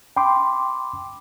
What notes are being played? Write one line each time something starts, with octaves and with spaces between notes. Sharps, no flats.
G5 B5 C6 D6